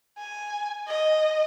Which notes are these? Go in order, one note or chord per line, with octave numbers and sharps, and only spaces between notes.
G#5
D#5